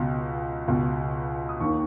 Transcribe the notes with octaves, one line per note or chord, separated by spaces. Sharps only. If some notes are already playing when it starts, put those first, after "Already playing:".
Already playing: C#2 B2
C#2 B2
D#6
D#2 D#3 C#6